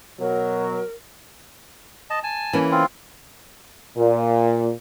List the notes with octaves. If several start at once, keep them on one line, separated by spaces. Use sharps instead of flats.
B2 F#3 A#4
D#5 A5
G#5 A5
E3 A#3 C#4
C4 F4
A#2